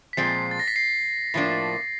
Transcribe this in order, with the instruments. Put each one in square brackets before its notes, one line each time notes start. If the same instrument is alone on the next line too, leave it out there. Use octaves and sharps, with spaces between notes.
[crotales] B6
[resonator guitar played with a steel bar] A#2 F3 G#3 C4 [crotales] C7
[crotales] A6
A#6
B6
C7
[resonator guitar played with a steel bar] A2 F3 A#3 D4